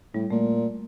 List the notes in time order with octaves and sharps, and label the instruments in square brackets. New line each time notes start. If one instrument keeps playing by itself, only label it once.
[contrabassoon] A2 [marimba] G3
[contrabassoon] A#2 [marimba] A3